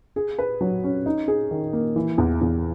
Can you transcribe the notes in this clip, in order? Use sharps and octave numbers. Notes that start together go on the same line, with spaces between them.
G#4
B4
F#3
C#4
D#4
G#4
D#3
A#3
E3
E2
E2